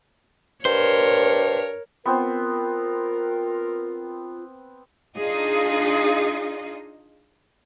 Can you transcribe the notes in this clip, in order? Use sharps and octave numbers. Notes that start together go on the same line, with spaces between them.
G2 A#4 C5 C#5
B3 C4 F4 A#4
D4 D#4 F4 G#4 D#5